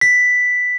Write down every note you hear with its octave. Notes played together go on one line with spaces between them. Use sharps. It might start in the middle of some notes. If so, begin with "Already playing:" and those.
B6